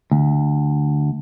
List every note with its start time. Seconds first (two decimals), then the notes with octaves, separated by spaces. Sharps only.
0.11 D2